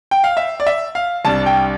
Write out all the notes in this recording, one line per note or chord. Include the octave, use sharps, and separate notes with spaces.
G5
F5
E5
D5
E5
F5
C2 C3 G3 D4 A5
G5